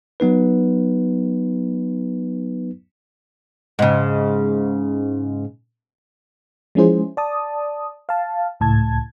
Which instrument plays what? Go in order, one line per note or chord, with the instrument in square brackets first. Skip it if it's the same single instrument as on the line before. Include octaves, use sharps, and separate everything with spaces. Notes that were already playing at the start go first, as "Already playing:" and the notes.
[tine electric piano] F#3 B3 D#4 B4
[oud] G#2 C#3
[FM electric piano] F3 G#3 C#4 E4 G#4 C5
D5 A5 D#6
F5 A5
C#2 A2 A5 G#6